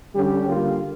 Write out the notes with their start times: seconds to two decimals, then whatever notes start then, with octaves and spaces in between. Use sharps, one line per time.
0.15 D3 G3 C#4 G4
0.47 D3 G3 A#3 F4